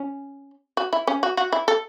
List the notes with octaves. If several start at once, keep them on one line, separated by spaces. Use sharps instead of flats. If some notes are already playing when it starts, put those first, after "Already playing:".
Already playing: C#4
F#4
E4
C#4
F#4
F#4
E4
A4